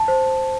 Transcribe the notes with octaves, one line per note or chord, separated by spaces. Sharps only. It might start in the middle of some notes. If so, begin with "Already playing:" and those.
Already playing: A5
C5